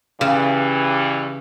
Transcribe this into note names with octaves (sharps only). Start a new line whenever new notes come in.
G2 C#3 E3